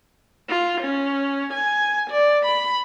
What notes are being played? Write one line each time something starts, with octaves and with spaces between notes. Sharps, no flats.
F4
C#4
G#5
D5
B5